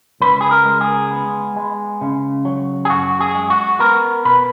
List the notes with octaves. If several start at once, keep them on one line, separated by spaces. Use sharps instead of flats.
C#2 B4
G#4
A#4
G#3
G#4
B3
G#3
C#3
F#3
G#4
F#2 F#4
G#4
G#3
F#4
B3 A#4
B2 B4